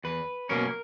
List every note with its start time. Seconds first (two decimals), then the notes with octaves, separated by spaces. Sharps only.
0.04 E2 B4
0.49 B2 F#3 A#3 C#4 A#4